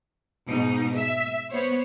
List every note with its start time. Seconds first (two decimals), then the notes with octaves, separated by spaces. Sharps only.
0.47 G#2 B2 D#4
0.96 E5
1.52 B3 C5 C#5